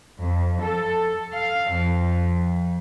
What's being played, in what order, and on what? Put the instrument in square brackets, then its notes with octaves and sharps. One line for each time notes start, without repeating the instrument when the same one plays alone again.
[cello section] F2
A4
F5
F2